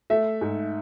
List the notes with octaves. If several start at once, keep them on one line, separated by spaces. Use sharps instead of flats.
A3 E5
G#2